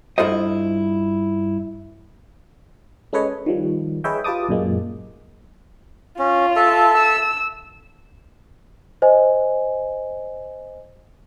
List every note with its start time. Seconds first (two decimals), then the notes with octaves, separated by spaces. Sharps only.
0.18 G2 E4 F4 A4 C5 D#5
3.13 G#3 C#4 A4 B4 C#5 D#5
3.46 D#3 F3 G3
4.04 G#4 B4 C#5 D#5 E5 G5
4.24 F4 G4 B4 A5 D6 D#6
4.49 F#2 A#2 G#3 A#3
6.19 C#4 F4
6.56 A4 E5 A5
6.97 E6
9.02 C5 D#5 G#5